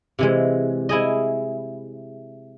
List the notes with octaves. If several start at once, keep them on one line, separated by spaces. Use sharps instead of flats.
C3 E3 G#3
E4 G#4 D#5